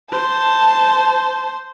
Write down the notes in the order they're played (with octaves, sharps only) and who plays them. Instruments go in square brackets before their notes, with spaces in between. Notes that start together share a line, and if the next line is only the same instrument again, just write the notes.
[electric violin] C5 [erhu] A5